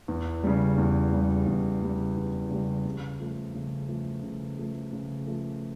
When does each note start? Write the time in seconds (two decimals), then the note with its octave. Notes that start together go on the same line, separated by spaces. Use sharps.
0.08 E2
0.44 C#3 G3
0.78 E2
1.12 C#3 G3
1.47 E2
1.82 C#3 G3
2.17 E2
2.50 C#3 G3
2.85 C#3
3.20 F3 A3
3.55 C#3
3.89 F3 A3
4.23 C#3
4.58 F3 A3
4.93 C#3
5.27 F3 A3